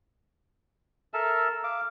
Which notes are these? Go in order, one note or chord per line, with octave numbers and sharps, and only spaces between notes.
A4 A#4 E5 A5
F5 D6